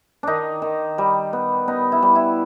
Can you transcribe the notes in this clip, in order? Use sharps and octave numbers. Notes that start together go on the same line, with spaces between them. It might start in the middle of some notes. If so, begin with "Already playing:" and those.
D#3 D4 D#4
D#3
G3
B3
B3 D#4
E4
G3
E4